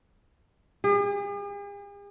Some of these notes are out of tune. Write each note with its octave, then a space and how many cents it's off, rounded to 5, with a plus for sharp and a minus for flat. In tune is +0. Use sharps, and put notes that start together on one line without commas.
G#4 -45